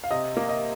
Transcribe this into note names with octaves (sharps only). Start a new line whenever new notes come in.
F5
C3 D#5
A#3
D#5